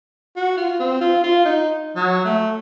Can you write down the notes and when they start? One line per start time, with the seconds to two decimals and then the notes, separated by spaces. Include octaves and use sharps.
0.36 F#4
0.57 F4
0.80 C4
1.01 F4
1.23 F4
1.45 D#4
1.96 F#3
2.25 A3